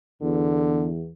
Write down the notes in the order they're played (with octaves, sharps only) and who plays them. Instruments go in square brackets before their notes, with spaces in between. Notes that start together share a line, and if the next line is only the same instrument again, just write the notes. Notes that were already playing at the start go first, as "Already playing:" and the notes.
[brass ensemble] E2 [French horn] D3